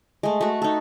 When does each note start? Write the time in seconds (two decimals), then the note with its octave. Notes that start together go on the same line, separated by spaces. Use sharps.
0.23 G#3 A3
0.41 A3 F#4
0.62 D#4 A4